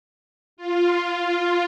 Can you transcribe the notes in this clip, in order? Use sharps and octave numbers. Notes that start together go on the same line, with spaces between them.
F4